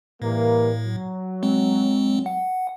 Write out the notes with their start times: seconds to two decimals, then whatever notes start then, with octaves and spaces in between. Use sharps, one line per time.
0.22 A2 E3 G3 A#3
0.85 F#3
1.43 G#3 C4
2.26 F#5